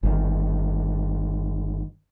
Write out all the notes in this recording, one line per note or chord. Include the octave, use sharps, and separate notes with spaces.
G1 D#3